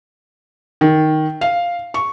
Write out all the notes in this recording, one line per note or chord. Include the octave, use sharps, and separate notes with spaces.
D#3
F5
C#6